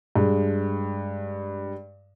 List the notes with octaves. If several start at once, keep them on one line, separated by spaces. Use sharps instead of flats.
G2 G#3